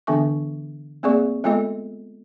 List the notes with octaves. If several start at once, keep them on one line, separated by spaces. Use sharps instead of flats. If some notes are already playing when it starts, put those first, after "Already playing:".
D3 E3 B3 D4 E5 C#6
A3 A#3 C4 G#4 D5 C#6
G#3 A3 B3 F4 A4 D#5